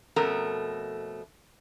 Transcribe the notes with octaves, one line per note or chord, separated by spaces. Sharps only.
F2 B2 A3 C#4 A#4 A#5